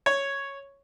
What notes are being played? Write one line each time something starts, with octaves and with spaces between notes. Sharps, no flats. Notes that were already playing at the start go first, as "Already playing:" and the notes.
C#5